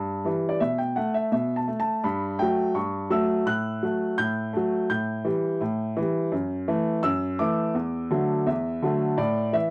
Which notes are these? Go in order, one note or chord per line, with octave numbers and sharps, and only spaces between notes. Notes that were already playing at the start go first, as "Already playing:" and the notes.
Already playing: G2
E3 G3
D5
B2 E5
G5
A3 F#5
E5
B2 E5
A5
A3
A5
G2 B5
F#3 A3 G5
G2 C#6
F#3 A3 E6
A2 F#6
F#3 A3
A2 G6
F#3 A3
A2 G6
E3 G3
A2
E3 G3
F#2
E3 A3
F#2 E6
E3 A3 D6
E2
D3 F#3 A3
E2 E5
D3 F#3 A3
A2 D5
E3 E5